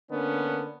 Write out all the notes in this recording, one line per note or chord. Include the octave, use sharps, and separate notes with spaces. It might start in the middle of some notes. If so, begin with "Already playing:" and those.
D3 A#3 B3 C#4 D4